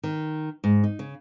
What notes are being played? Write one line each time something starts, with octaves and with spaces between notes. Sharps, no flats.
D#3
G#2
D#4
C#3